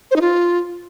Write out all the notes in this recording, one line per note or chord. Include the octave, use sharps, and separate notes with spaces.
C5
D#4
F4